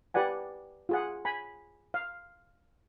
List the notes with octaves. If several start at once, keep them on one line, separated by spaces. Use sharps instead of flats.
G4 B4 D5 F#5 G#5
F4 G#4 F#5
G#5 B5
F5